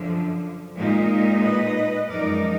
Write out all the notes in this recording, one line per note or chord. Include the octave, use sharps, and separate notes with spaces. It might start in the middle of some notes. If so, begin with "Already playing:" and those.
Already playing: F#2 D3 F3
A#2 G#3 D#4
B4 D#5
F#2 F3 G#3 D#4 A#4 D5